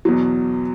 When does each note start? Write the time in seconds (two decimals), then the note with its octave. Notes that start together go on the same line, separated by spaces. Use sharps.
0.05 E2 B2 F#3